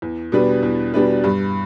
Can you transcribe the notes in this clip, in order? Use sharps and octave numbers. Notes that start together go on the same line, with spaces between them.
E2
B2 G3 D4 B4
E2
B2 G3 D4 B4
G2